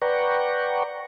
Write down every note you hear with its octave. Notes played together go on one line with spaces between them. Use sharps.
B4 D5 F#5 G5 A#5 C#6